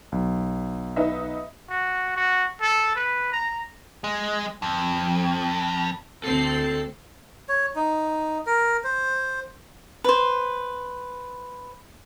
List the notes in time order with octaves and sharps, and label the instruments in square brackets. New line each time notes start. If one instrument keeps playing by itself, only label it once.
[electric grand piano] B1
[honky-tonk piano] D#4 B4 E5
[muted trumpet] F#4
F#4
A4
B4
A#5
[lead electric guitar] G#3
F2
[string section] D2 C4 C7 [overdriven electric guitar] A4
[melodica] C#5
D#4
A#4
C5
[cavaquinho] B4 C5